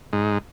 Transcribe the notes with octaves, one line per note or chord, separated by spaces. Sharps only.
G#2